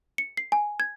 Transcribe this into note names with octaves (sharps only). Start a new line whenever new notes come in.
C#7
C7
G#5
G#6